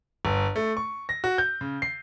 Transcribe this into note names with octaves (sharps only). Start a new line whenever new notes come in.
G1
A3
C#6
A#6
F#4
G6
C#3
C7